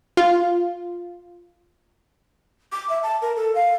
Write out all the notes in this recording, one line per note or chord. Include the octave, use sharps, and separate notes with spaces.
F4
D6
E5
A5
A#4
A4
F5